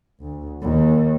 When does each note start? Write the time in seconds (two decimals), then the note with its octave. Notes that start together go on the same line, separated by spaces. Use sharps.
0.20 D2
0.62 D#2